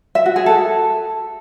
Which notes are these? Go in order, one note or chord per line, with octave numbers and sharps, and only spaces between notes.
E5
F#4
G#4
A4